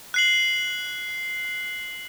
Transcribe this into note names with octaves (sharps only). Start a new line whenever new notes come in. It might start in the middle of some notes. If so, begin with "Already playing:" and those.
F#6 C7 F#7